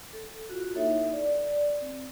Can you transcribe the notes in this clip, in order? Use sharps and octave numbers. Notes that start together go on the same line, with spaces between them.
A4
F4 F#4
A#3 D#4 E4 A4 C#5 E5
D5
C4